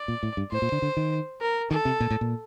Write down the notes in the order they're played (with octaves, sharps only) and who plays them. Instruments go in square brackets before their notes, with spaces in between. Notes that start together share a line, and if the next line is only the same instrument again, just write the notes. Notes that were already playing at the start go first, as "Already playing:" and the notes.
Already playing: [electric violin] D5
[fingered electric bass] A#2
A2
G2
[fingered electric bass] A2 [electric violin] C5
[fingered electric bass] A#2
D3
D3
D#3
[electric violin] A#4
[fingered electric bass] D#3 [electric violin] A4
[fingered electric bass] C3
A#2
A2
A#2